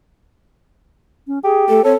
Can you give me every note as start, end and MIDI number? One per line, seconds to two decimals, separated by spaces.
1.27 1.39 61
1.44 1.84 67
1.44 1.68 68
1.69 1.83 57
1.69 1.84 69
1.84 1.94 60
1.84 1.96 69
1.84 1.92 73